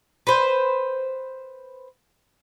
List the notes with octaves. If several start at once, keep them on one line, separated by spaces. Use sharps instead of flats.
B4 C5